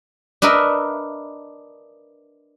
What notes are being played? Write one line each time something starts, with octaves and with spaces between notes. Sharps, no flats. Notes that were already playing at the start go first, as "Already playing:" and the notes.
D4 A#4 B4 D#5 E5